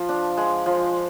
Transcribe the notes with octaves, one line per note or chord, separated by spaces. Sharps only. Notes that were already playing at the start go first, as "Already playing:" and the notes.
Already playing: F3
D4
G#3
F3